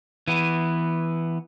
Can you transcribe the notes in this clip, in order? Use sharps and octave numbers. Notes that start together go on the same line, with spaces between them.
E3 B3